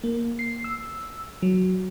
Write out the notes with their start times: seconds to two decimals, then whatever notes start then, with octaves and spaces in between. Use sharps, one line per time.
0.04 A#3
0.39 C7
0.64 E6
1.42 F#3